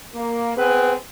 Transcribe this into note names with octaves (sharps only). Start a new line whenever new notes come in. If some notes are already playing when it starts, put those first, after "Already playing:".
A#3
B3 C4 G#4 B4